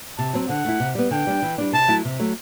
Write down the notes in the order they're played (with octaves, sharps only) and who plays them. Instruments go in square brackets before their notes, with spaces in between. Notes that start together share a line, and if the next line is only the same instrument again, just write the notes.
[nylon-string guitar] C3 [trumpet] A5
[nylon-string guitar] F#3 C4
[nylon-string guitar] D3 [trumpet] F#5
[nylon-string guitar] A3 E4
C3
G3 B3
[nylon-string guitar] D3 [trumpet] G5
[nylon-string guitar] G3 D4
E3
G3 D4
[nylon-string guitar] C3 [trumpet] A5
[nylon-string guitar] F#3 A3 E4
C3
F#3 A3